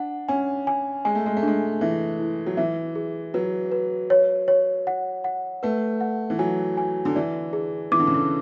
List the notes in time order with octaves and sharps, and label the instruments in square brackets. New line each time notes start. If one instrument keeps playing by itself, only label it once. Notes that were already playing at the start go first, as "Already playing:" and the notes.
Already playing: [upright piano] D4 [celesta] F#5
[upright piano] C#4 [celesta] G#5
[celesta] G#5
[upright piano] G#3 [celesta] G#5
[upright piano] A3
G#3
A3
[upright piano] G#3 [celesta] D4
[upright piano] E3 [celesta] E5
[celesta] E4
[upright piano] F#3
[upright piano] E3 [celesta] E5
[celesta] G#4
[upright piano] F#3 [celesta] B4
[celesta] B4
C#5
C#5
F#5
F#5
[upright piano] A3 [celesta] B4
[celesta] F#5
[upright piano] E3
[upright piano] F#3 [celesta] G#5
[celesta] G#5
[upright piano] D3
[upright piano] E3 [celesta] D5
[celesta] G#4
[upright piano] E3 [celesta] D6
[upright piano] D3
C#3
D3